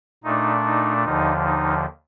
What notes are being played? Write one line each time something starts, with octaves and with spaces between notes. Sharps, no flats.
A#2 A3 D4 D#4
D#4
D#2 D3 F3 D#4
D#4